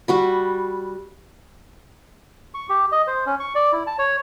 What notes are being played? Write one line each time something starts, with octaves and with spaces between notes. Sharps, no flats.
G3 F#4 B5
C#6
G4
D#5
C5
C#4
C#6
D5
E4
A5
C#5